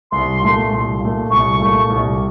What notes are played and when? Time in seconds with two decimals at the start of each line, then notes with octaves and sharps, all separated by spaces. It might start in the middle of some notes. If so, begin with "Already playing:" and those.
0.12 C2 C6
0.41 A#2 A3
0.71 C2
1.01 A#2 A3
1.31 C2 C#6
1.60 A#2 A3
1.90 C2